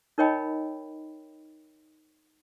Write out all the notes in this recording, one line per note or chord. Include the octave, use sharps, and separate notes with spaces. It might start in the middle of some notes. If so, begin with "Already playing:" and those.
D#4 A#4 C#5 D#5 G5 B5